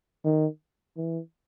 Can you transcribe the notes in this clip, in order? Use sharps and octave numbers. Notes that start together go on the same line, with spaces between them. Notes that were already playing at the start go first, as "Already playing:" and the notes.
D#3
E3